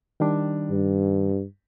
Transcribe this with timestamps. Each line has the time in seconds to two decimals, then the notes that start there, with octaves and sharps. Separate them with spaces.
0.20 D#3 G3 D4
0.70 G2